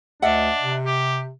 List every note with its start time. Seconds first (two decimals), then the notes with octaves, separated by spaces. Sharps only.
0.22 D2 D4 D#5 E5 F#5
0.62 C3
0.86 G4